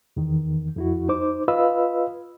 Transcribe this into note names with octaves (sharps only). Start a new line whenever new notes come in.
E2 D#3
F2 E4 F#4
D#4 C5 D6
F4 B4 D#5 F5 B5 E6